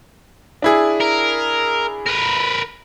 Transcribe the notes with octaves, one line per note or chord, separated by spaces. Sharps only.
D4 E4 G#4
A#4
A#4 B4